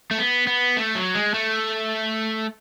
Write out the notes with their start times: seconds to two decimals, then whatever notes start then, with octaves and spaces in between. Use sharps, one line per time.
0.11 A3
0.18 B3
0.47 B3
0.77 A3
0.95 F#3
1.15 G#3
1.34 A3